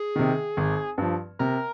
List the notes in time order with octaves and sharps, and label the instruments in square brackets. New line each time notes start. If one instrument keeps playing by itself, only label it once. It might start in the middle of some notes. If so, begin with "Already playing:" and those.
Already playing: [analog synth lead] G#4
[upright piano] C3 D#3
G#1
G2 F3
[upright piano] C3 [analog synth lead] A#4